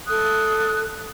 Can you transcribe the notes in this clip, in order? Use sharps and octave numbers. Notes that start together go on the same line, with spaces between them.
A4 D#6 F#6